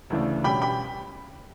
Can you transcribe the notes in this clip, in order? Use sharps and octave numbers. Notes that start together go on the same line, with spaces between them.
D2 C#3 E3 A3 D4
B2 G3 C#4 G5 B5
G5 B5